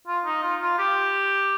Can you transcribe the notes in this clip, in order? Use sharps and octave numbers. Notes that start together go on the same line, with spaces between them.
F4
D#4
F4
F4
G4